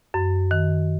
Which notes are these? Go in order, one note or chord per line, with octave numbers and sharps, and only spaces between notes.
F#2
D#3